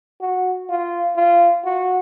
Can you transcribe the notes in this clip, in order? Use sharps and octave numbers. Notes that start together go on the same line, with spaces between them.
F#4
F4
F4
F#4